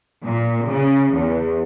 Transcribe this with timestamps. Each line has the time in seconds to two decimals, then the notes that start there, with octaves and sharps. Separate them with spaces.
0.24 A#2
0.70 C#3
1.14 E2